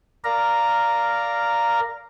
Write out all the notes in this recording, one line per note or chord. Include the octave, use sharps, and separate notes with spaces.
A#4 D5 F5 A#5